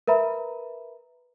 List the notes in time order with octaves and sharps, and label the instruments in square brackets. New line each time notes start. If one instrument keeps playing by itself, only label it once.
[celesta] A#4 B4 E5 A#5 B5